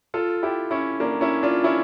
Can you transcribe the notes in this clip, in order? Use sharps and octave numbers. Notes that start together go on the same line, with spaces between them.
F4 A4
E4 G4
C#4 E4
A#3 D4
C#4 E4
D4 F4
C#4 E4